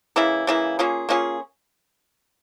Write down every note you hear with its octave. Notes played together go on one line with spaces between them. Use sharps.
C#3 E3 A#3 E4
C#3 E3 A#3 E4
A#3 C#4 F4 G#4
A#3 C#4 F4 G#4